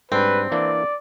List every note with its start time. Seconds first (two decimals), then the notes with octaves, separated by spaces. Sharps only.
0.12 G#2 G3 C4 D4 B4
0.52 E3 A#3 D4 D5